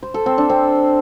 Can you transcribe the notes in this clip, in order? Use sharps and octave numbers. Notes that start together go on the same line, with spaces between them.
C5
A4
C4
D4
C4